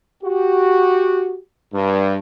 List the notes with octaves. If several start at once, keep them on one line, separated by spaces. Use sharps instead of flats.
F#4 G4
G2